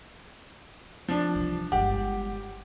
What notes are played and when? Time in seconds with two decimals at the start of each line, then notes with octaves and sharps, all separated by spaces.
1.08 F3 D4
1.35 C2 E3
1.72 G1 G#3 G4 F#5